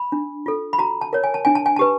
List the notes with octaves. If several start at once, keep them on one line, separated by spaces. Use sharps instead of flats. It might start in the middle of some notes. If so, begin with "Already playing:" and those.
Already playing: B5
D4
F4 A4
B5
F#4 A#5
A5
A#4 C#5
G#5
A5
D4 G#5
A5
G#5
G4 B4 A5